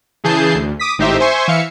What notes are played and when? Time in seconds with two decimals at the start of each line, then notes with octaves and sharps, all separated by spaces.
0.24 C#3 E3 G#4 A5 G6 C7
0.55 D2
0.79 D6 D#6 B6
0.98 G#1 A2 D#4 G4 C5 E5
1.20 C5 E5 G#5 C6 C#6
1.48 E3 E5 F5 C#7